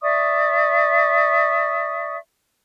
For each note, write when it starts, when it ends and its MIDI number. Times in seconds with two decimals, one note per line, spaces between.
0.02 2.17 74
0.02 2.17 76
0.02 2.17 85
0.02 2.17 87